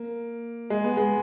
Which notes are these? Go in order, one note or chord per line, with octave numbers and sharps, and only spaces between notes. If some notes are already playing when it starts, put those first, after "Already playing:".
Already playing: A#3
G#3
B3
G#3